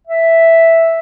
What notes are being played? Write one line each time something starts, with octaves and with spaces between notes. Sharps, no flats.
E5